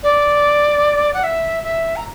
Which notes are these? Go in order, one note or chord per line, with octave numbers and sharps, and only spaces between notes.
D5
F#5
E5
E5
A#5